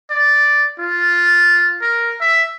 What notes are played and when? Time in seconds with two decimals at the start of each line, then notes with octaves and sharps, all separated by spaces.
0.10 D5
0.79 F4
1.82 A#4
2.21 E5